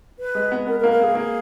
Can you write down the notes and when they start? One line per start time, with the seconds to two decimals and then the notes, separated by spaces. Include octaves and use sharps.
0.19 B4
0.35 G#3
0.52 B3
0.67 B3 A#4
0.80 A#4
0.83 A#3
0.92 A#4
1.00 A#3 G#4
1.15 A#3